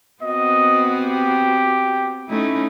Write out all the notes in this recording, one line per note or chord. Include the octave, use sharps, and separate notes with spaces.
B3 C4 F#4 D#5
G4
A3 C#4 D#4 E4